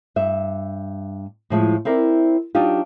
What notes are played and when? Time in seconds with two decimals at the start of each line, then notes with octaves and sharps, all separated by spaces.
0.16 G2 E5
1.50 A2 F3 G#3
1.85 C4 E4 A#4 C5 D5
2.55 F#3 D4 D#4 F4 G4